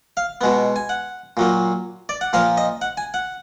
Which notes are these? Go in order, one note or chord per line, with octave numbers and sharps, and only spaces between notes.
F5
B2 G#3 B3
G#5
F#5
A#2 F#3 A#3
D5
F#5
A#2 F3 A#3 F5
D#5
F#5
G#5
F#5